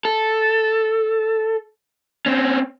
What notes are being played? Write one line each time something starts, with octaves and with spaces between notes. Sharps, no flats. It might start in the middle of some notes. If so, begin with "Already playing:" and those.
A4
C4 C#4